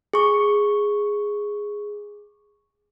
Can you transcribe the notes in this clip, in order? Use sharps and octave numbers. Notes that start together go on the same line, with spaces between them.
G#4 C#6